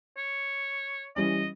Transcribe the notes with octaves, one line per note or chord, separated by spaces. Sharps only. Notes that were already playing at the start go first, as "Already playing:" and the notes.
C#5
E3 G3 C#4 D#5